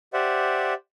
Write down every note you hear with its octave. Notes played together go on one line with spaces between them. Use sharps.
G4 C5 D5 E5 F#5